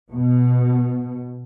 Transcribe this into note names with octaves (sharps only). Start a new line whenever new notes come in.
B2